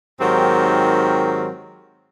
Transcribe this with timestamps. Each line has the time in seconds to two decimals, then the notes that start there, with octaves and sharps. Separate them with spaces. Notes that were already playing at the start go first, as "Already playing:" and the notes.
0.21 G#2 D#3 F#3 C4 G4 A#4